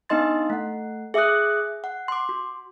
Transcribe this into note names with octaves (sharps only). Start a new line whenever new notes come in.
B3 D4 D#4 D#5 C6 A6
A3 F#5
G#4 E5 D6 D#6 F#6
F#5
C6 D6
F#4